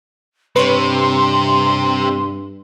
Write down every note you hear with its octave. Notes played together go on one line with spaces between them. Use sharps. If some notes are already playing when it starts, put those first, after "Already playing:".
G2 C3 B4 C#5 C6